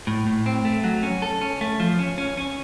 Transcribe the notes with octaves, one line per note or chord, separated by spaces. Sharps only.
A2
A2
C4
A3
F#3
C#4
A4
C#4
A3
F3
C#4
C#4
C#4